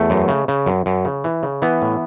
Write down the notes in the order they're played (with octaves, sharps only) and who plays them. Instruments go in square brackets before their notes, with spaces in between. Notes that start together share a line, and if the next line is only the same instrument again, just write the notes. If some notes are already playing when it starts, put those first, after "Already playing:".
Already playing: [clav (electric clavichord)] E2 A3
F#2
C#3
C#3
F#2
F#2
C#3
E3
C#3
E3 B3
A2